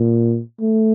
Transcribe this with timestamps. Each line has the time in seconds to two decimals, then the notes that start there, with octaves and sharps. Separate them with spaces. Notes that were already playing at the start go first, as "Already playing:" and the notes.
Already playing: A#2
0.61 A3